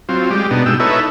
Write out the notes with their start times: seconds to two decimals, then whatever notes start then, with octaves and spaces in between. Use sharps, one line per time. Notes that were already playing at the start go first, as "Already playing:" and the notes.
0.09 F#3 C4 F4
0.30 G3 G#3 G4
0.51 B2 B3 D4 D#4
0.66 B2 G#3 G5 E6
0.80 D#4 E4 A4 B4 C#5 E5